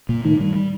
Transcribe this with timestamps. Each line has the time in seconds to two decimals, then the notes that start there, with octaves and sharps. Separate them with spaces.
0.09 A#2 A#3
0.24 A2 D#3 A3
0.40 G2 G3
0.55 G3